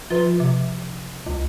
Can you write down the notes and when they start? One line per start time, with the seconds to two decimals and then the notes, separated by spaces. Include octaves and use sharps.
0.10 F3 F4 B4
0.40 C3
1.26 C#2